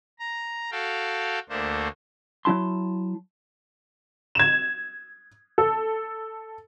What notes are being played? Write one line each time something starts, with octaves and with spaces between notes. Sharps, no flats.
A#5
F#4 A4 F5 G5
D2 A3 A#3 D4 C5
F#3 B3 E4 A5 C6
G#6 E7
A4